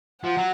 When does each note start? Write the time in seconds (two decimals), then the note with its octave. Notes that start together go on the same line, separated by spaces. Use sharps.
0.23 F3 F#5
0.37 F#3